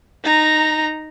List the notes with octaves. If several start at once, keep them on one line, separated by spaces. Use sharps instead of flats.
D#4 A#5